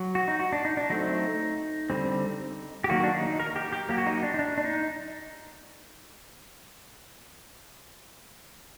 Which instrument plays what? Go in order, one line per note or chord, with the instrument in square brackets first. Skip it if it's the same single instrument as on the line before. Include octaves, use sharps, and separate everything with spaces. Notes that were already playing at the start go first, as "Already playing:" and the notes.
Already playing: [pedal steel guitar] F#3
F#4
D#4
F#4
D4
D#4
D4
F#3 A3 C4 D#4
D3 G3 C4
G4
D#3 F#3 A#3 F#4
D4
D#4
A#4
G4
G4
F#3 A#3 G4
F#4
D#4
D4
D#4
D4
D4
D#4